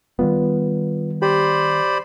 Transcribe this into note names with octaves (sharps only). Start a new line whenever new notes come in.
D#3 G3 B3 F4 B4
G4 C5 D5 B5